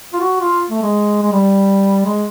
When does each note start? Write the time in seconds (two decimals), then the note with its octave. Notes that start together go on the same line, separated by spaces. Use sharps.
0.13 F4
0.21 F#4
0.40 F4
0.70 A3
0.82 G#3
1.22 G#3
1.32 G3
2.05 G#3